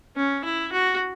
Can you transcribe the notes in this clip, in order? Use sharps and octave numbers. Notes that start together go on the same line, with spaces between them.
C#4
E4
F#4